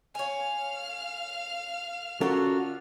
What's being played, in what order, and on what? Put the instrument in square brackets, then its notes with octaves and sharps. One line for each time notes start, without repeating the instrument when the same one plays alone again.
[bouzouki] C#5 G#5 [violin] F5 F6
[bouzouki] D3 F4 [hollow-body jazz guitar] C#4 A4 A#4 [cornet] F#4